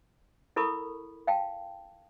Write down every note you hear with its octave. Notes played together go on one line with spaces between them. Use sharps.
E4 A4 A#4 B5 C#6 D#6
F5 G5 A5